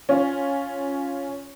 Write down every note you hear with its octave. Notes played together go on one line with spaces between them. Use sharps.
C#4 F4